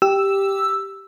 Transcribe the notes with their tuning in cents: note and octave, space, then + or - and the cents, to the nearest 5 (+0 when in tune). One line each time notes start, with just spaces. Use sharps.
G4 +0 E6 +0